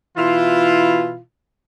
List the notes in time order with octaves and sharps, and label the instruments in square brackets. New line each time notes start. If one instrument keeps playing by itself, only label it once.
[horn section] B2 E3 E4 F4